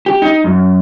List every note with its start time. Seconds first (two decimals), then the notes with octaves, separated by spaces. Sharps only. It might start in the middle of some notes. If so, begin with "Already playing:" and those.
0.06 G4
0.22 D#4
0.44 F#2